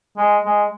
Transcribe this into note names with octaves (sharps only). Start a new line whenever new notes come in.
G#3
G#3